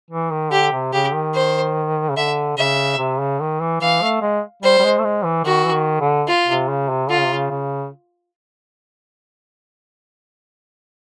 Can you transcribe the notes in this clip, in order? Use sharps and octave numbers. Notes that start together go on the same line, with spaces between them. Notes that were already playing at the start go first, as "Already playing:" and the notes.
E3
D#3
D3 G4
C3
C#3 G4
D#3
C5
C#3
D3 E5
C#3 E5
C3
C#3
D#3
E3
E3 F5
A3
G#3
G3 C5
G3
G#3
A3
G#3
E3
D#3 F#4
E3
D#3
D3
F4
C3
C#3
C3
D3 F4
C#3
C3
C#3
C#3